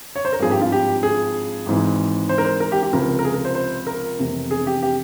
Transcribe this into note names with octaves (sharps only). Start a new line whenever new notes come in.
C#5
C5
A#4
G#1 G2 F3 G#4
G4
F4
G4
G#4
G#1 G#2 E3
C5
A#4
C5
A#4
G4
G4
C#2 C3 F3 A#4
A#4
G#4
A#4
C5
C5
A#4
F1 E2 C3
G#4
G4
G4